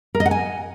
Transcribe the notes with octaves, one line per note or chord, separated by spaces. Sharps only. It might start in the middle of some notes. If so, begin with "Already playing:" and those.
A#4
D#5
F#5
G#5